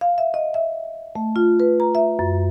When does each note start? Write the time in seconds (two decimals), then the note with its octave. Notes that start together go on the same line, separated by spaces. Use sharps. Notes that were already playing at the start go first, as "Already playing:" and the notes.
0.01 F5
0.18 E5
0.34 D#5
0.54 E5
1.16 A3
1.36 F4
1.60 B4
1.80 A#5
1.95 E5
2.19 F#2